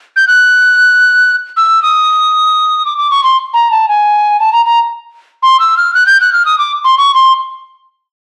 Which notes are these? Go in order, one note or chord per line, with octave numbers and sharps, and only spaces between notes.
G6
F#6
E6
D#6
D6
D6
C#6
C6
A#5
A5
G#5
A5
A#5
A#5
C6
E6
F6
F#6
G6
F#6
F6
D#6
D6
C6
C#6
C6